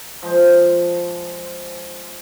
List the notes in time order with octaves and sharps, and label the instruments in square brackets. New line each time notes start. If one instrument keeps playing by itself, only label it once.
[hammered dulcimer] F3 G#3 C5